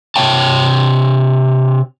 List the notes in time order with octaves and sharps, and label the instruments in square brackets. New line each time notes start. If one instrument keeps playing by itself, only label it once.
[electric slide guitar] C3 C#5 G5 A5